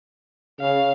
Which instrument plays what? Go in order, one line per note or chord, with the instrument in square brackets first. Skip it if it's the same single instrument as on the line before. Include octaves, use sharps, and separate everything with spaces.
[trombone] C#3 [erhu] F5